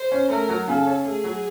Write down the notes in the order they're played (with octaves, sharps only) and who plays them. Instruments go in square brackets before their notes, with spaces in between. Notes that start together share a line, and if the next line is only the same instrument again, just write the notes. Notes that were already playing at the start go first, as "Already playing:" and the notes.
Already playing: [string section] C5
[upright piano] C#4
[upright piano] A3 [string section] A#4
[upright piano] F#3
[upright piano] C#3 [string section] A4
[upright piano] C#4
[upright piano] A3 [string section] G#4
[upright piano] F#3